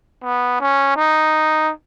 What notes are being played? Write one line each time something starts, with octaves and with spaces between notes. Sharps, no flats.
B3
C#4
D#4